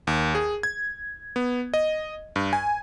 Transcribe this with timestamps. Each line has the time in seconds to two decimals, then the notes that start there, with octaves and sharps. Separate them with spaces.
0.07 D#2
0.35 G#4
0.63 G#6
1.36 B3
1.74 D#5
2.36 G2
2.53 G#5